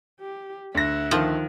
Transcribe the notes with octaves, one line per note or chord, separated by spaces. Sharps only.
G4
D2 E5 F#5 A#6
D#3 F3